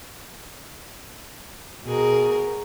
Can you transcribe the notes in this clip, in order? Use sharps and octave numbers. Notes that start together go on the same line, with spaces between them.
B2 G#4 A#4